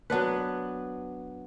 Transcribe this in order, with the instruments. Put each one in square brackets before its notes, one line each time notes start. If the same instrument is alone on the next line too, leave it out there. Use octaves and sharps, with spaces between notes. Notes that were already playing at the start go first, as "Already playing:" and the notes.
[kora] F#3 B3 D4 B4